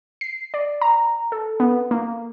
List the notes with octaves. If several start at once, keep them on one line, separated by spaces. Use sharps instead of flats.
C7
D5
A#5
A4
B3
A#3